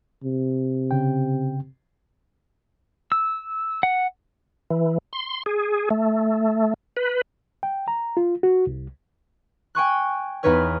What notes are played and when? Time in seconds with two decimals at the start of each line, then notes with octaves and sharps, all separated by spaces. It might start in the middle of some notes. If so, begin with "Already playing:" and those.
0.24 C3
0.91 C#3 G5
3.12 E6
3.83 F#5
4.70 E3
5.13 C6
5.46 G#4
5.90 A3
6.97 B4
7.63 G5
7.88 A#5
8.17 F4
8.43 F#4
8.67 C2
9.75 G5 G#5 C#6 F#6
10.43 E2 B3 D#4 B4 C#5 F6